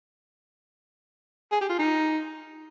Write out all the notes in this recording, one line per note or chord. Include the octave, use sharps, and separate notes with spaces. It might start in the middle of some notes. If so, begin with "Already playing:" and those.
G#4
G4
F4
D#4